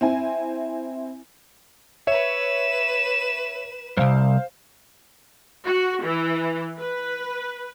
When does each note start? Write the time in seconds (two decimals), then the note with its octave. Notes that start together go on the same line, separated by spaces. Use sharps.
0.01 C4 E4 G#5
2.07 B4 C#5 E5 E7
3.97 C2 F#2 C5 F5
5.66 F#4
6.03 E3
6.79 B4